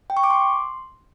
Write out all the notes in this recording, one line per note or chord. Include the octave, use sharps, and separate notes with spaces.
G5
C#6
D6
C6